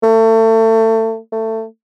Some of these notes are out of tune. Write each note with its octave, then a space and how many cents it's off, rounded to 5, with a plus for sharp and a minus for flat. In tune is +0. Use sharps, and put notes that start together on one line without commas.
A3 +30
A3 +20